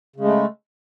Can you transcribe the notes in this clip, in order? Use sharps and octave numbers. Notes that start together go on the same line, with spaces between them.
C#3 G#3 A3